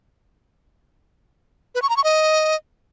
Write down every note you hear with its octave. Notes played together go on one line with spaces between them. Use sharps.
B4
C#6
A#5
C#6
D#5